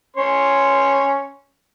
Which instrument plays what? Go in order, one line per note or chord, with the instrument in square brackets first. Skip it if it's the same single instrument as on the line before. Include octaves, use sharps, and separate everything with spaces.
[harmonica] C#4 C#5 C6